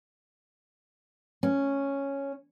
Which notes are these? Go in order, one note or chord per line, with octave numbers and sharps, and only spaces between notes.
C#4